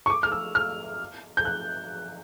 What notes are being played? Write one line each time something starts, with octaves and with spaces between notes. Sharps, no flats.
C#6
D6
F6
E6
F6
G6
F#6